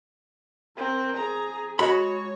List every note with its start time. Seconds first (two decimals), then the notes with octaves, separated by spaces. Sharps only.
0.77 C4 A#4
1.16 G#4 A#5
1.79 G#3 F#4 C#5 B5